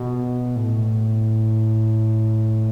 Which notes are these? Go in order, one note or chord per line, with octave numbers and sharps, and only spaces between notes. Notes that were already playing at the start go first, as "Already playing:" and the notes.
Already playing: B2
A2